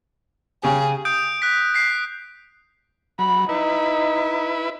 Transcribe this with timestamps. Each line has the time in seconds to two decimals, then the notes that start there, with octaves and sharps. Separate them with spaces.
0.63 C#3 G4 G#4
1.05 D#6 G6 D7
1.42 F#6 B6
1.74 B6 C7
3.19 F#3 B5
3.49 D#4 E4 B4